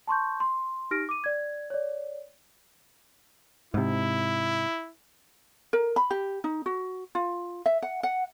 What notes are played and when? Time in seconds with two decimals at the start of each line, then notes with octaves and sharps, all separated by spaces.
0.07 A5 C6 C#6 G6
0.40 C6
0.91 D#4 G4 F6 A#6 D7
1.09 D6 D#7
1.24 D5 G#6
1.70 C#5 D5
3.74 G#2 C3 E4
5.73 A#4
5.96 B5
6.11 G4
6.44 D#4
6.66 F#4
7.15 F4
7.66 E5
7.82 F#5
8.03 F#5